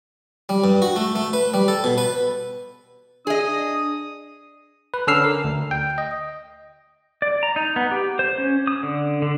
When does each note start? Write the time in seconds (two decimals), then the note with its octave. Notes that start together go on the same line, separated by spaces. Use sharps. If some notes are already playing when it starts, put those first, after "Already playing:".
0.49 G3
0.64 G2
0.82 F#4
0.96 A3
1.15 A3
1.33 B4
1.54 G3
1.68 A4
1.84 B2
1.98 B4
3.27 D4 G#4 D#5 D#6
4.94 B4
5.07 D3 C#4 A4 E6 F6 C7
5.24 A#4
5.44 D2
5.71 G5
5.98 D#5
7.22 D5
7.43 A#5
7.56 D#4
7.76 B3
7.91 G4
8.19 C5
8.38 C#4
8.67 D#6
8.83 D3
9.22 D3